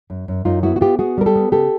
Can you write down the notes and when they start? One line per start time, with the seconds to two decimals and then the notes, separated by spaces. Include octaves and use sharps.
0.10 F#2
0.28 F#2
0.45 F#2 D#4 F4
0.63 B3 E4 F#4
0.76 F#4
0.81 B3 F4 G4
0.99 B3 F#4 G#4
1.18 G3 A#4
1.26 G4 A4
1.36 B3
1.52 C#3 G4 A4